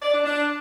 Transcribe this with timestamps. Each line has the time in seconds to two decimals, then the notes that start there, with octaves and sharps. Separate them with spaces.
0.02 D5
0.13 D4
0.25 D4